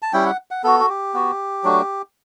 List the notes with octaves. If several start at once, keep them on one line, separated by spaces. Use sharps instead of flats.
A5
G3 C#4 E4 G5
F#5
F#5
B3 F#4 A4
F#4
G4
B3 F#4
F#3 A3 D4 F#4